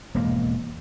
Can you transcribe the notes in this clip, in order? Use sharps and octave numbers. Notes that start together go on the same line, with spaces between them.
E1 F2 G#2 A#3